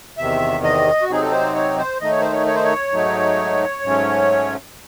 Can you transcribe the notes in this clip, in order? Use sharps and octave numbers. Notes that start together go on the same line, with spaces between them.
E2 C3 D#3 E5
D#5
F#4
C3 F#3 C4 D#4 G#4
A4
C5
C#5
C5
D#3 A3 D#4 D#5
C#5
C5
C#5
C#5
C5
C#5
G#2 F#3 A3 D#4
G#2 F#3 A3 C#4